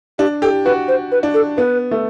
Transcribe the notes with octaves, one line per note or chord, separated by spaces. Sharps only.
D4 G4
G4 A4
F#4 B4
C5
B4
D4
A4
B3 B4
A3